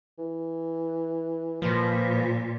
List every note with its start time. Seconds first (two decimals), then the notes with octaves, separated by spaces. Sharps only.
0.18 E3
1.62 A#2 F3 B4